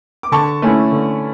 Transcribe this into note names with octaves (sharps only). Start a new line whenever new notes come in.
D6
D3 A5 C#6
A3 C#4 E4
D3